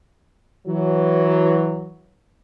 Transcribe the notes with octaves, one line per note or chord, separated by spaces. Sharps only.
E3 F#3